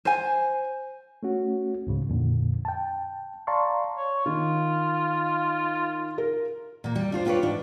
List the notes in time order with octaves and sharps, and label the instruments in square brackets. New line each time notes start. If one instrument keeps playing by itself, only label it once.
[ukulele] C5 G#5
[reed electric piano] A3 C#4 F#4
C#2 G#2 C#3
F2 A#2 D3
G5 A5
D5 F5 A5 A#5 C6 C#6
[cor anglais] C#5
[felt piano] D#3 [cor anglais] F4
[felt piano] A#4
[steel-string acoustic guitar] A#2 A#3
G3
D4 F4 C5
D4 F4 G4 A4 B4 C#5
G#2 D4